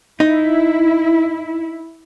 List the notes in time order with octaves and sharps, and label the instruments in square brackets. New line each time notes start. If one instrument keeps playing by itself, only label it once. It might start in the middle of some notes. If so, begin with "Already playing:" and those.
[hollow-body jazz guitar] D#4 [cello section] E4